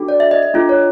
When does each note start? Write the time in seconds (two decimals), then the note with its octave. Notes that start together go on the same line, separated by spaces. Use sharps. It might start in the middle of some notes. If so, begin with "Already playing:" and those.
Already playing: D4 F#4 A4
0.08 D5
0.20 E5
0.31 D#5
0.43 D#5
0.54 D4 F4 A4
0.69 C#5